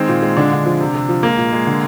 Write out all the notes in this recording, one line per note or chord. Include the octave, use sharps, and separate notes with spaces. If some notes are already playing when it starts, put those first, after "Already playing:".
Already playing: D#3 G#3 C4
A#2
G#3
D3 D4
D3
F3
C3
C3
F3
G#3 A#3
A#2
G#3
D3